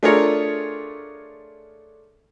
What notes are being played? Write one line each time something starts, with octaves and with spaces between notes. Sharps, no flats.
A3 D4 F4 G#4 A#4 C#5